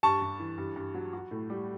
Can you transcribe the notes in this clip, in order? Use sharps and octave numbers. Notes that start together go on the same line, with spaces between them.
G2 A5 C#6
G2
E3
G2
G2
F#3
F#4
A2
G3